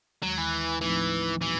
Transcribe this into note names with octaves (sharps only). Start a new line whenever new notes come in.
D#2 D#3 F#3 G#3
E3
A2 E3 F3 A3 C4 D#4
A#2 E3 G3 B3 D#4 F#4